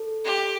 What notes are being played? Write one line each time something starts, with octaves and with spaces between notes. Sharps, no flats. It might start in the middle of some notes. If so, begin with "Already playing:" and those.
Already playing: A4
G4